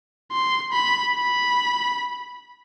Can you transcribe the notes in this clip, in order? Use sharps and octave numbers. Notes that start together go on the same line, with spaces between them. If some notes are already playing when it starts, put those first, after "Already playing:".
C6
B5
B5